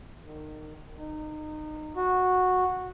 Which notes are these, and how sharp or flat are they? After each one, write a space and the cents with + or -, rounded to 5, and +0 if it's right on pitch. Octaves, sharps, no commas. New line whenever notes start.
D#3 -25
D#4 -25
F#4 -10